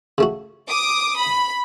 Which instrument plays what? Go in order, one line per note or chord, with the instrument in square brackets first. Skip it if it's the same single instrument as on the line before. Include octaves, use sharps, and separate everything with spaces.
[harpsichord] C#3 A3 F#4
[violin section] D6 D#6
B5